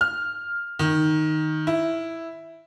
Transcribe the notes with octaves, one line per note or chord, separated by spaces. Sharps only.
F6
D#3
E4